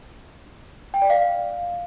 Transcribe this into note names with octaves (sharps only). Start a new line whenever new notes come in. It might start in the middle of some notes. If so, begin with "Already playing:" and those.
G5
D5
F5